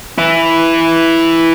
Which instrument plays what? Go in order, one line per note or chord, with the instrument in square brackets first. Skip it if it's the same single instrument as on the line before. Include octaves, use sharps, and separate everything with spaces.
[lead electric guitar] E3 E4